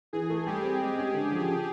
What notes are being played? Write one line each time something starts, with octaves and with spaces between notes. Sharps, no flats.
E3 G#4
A3
G3 G4
C4
G#3
C#4
D3
F3
C#3